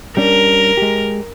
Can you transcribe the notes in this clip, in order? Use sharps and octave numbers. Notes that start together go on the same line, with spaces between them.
G3 C#4 D4 A#4
G#3 G4